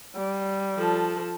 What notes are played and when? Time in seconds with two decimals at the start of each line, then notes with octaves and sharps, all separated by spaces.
0.15 G3
0.77 F3 A4